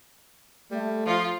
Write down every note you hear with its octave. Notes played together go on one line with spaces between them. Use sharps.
G3 A3
F3 F4